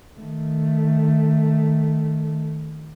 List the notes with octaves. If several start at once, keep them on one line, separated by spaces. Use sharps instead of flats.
D#3 A3